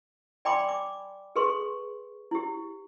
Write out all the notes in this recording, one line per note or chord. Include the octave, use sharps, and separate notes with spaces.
D5 G5 G#5 B5 C6 D6
D6
G#4 A4 B4 C6 C#6
E4 G4